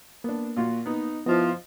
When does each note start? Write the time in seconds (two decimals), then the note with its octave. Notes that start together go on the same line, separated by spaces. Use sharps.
0.24 A#3 B3 D4
0.56 A#2 F4 F#4
0.86 B3 D#4
1.26 F3 B3 E4 F4 D#5